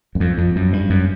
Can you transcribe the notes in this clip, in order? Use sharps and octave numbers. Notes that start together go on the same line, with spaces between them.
F#2
F2
F2
F#2
G2
F#2